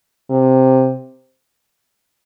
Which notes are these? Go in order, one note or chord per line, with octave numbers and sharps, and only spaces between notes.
C3